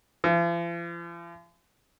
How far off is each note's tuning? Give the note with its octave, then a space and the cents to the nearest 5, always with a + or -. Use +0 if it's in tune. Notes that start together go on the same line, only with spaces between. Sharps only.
F3 -45